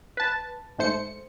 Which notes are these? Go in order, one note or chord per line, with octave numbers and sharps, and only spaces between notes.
B4 A5
G#2 A3 C5 C#7